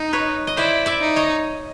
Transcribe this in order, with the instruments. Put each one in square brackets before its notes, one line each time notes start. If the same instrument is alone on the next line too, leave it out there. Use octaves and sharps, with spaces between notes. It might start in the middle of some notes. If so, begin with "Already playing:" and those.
Already playing: [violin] D#4
[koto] B4 C#5
D#5
[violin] E4 [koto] C5 D5
[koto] D5 E5
[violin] D#4
[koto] C#5 D#5